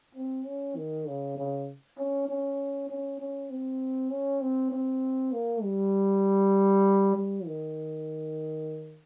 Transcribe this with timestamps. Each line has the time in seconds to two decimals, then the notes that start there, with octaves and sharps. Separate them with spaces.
0.15 C4
0.46 C#4
0.76 D#3
1.07 C#3
1.36 C#3
1.98 C#4
2.28 C#4
2.89 C#4
3.19 C#4
3.50 C4
4.11 C#4
4.41 C4
4.71 C4
5.32 A#3
5.63 G3
7.15 G3
7.45 D#3